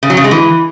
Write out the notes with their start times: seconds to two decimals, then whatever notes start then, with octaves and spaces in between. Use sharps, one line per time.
0.03 C#3
0.10 F#3
0.17 C#3
0.24 G#3
0.31 E3